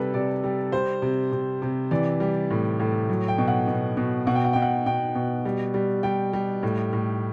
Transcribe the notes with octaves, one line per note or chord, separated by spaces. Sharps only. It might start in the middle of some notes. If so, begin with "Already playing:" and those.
Already playing: C3 G3 A4 B4
C3 D5
G3
G3 C5
C3
C3
C3
E3 D5
G3
A2
A2
F#3
G5
B2
F#5
B2
B2
B2 F#5
G5
F#5
B2 G5
F#5
B2 G5
B2
G3
G3
G3 G5
G3
A2
A2